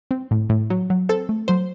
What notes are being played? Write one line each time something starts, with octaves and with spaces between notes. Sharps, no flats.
C4
A2
A2
F#3
F#3
C4 A4
A3
F#3 C5